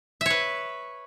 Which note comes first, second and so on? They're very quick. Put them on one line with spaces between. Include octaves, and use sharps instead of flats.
E5 C#5 B4